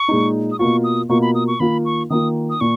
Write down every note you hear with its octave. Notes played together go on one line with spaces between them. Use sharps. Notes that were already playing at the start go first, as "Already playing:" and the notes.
Already playing: C#6
A#2 G#3 D#4
D#6
B2 A#3 F4 C#6
D#6
B2 A#3 F4 C#6
B5
D#6
C#6
D#3 A#3 F4 B5
C#6
D#3 A#3 F4 D#6
D#6
A#2 C#6